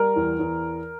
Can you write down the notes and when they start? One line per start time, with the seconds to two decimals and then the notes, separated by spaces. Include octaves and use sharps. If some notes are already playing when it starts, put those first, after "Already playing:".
Already playing: G3 A#4
0.16 E2
0.39 E2